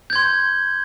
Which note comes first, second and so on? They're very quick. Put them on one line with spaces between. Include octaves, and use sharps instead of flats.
G6 G#6 C6